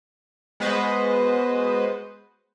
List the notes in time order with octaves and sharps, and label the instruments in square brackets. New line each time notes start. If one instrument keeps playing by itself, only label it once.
[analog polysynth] G#3 B3 F#4 B4 C5 D#5